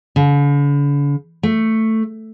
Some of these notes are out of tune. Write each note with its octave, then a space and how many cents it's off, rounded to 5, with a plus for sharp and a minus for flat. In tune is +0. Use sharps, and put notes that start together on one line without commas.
D3 -45
A3 +10